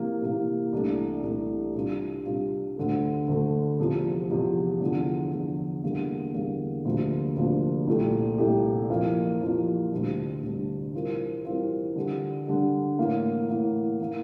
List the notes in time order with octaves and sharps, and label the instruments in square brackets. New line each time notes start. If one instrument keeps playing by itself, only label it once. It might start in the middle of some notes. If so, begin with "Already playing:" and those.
Already playing: [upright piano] C3 E3 A#3
C3 E3 A#3
C2 C3 E3 A3 D4
C2 C3 E3 A3 D4
C3 G3 D4 F4
C3 G3 D4 F4
D2 D3 A3
D2 D3 A3
E2 C3 F3
E2 C3 F3
E2 D3 F3
E2 D3 F3
E2 D3 G3 A#3
E2 D3 G3 A#3
D2 C3 F3 A#3 D4
D2 C3 F3 A#3 D4
C2 A#2 A3 E4 G4
C2 A#2 A3 E4 G4
F2 E3 A#3 F4
F2 E3 A#3 F4
D2 C3 G3 D4
D2 C3 G3 D4
E3 G3 C4 F4 A#4
E3 G3 C4 F4 A#4
D3 G3 D4
D3 G3 D4
A2 E3 A#3 E4
A2 E3 A#3 E4
E3 A#3